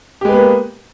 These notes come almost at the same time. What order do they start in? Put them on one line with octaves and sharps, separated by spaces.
G4 G#3 B4 B3 A#3